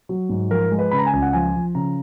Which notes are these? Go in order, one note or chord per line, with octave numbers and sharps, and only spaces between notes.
F#3
G#2
F3 A#4
G#3
B4
C#3 B5
A#5
G#5
C#2
F#5
F3 G#5
F3
C#3 A#5